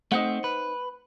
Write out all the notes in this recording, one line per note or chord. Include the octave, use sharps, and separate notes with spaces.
A3 C4 D#4 C5 F#5
B4